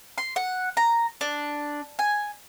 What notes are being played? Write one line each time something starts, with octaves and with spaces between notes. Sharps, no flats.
C6
F#5
A#5
D4
G#5